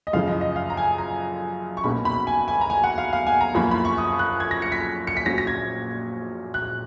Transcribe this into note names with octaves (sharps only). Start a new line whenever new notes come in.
D#5
F#2 C#3 F3 F5
D#5
D#5
F5
A#5
G#5
A#5
C#6
B1 B2 A#3 C#4 B5
B5
G#5
G#5
A#5
G#5
F#5
F5
F5
G#5
A#5
F#2 F3 A#3 C#4 B5
B5
C#6
D#6
F#6
G#6
A#6
C#7
B6
C#7
B6
A#1 A#2 F#3 C#4 A#6
A#6
G#6
F#6